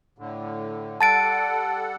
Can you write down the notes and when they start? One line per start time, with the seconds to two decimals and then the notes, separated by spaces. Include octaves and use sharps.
0.18 A2 D3
1.01 G3 A4 F#5 A5 A6 D7